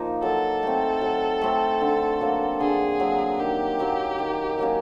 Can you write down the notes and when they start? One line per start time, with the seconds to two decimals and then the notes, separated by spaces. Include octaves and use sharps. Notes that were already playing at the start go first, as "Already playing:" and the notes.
Already playing: F3 A#3 D#4
0.22 F#3 A4
0.63 A3 C4
1.01 F#3
1.42 A3 C4
1.81 D3
2.21 F#3 A#3
2.60 D3 G#4
3.00 F#3 A#3
3.40 D#3 G4
3.79 F#3 A#3 C#4
4.19 D#3
4.59 F#3 A#3 C#4